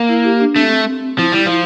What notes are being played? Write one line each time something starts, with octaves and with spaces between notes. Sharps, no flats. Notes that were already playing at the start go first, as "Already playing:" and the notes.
Already playing: A#3
E4
G4
D4
A3 C4
F3 E4
G3
F3